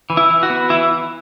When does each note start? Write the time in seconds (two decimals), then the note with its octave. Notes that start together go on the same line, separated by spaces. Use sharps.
0.10 E3
0.17 E4
0.30 E3
0.43 F#4
0.50 B3
0.70 E3 E4